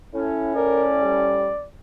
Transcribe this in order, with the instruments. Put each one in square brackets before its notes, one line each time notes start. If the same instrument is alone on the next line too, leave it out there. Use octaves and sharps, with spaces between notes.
[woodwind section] A2 C#4 [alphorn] E4
[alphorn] A#4 [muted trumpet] D5
[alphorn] G3